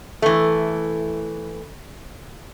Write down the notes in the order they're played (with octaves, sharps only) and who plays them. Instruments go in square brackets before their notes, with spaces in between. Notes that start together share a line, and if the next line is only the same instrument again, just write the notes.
[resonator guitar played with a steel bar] E3 A3